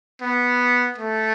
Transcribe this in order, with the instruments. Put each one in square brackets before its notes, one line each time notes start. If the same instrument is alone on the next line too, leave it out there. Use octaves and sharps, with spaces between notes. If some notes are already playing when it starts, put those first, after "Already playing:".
[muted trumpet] B3
A3